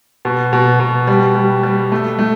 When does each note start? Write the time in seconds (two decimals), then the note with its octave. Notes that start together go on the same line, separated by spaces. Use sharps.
0.25 B2
0.53 B2
0.80 B2
1.07 G3
1.35 G3
1.63 G3
1.92 A3
2.19 A3